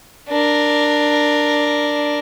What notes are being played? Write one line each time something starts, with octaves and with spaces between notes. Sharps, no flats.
D4 A#4